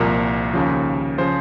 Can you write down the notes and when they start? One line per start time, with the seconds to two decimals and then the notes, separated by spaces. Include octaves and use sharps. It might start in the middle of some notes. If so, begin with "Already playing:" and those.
Already playing: C2 A#2 F3 A#4
0.54 D#2 C#3 F3
1.18 C#3 F3 C5